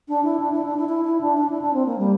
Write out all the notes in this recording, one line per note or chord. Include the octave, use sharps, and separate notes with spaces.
D4
E4
D4
E4
D4
E4
E4
E4
D4
D4
E4
D4
C4
A#3
G3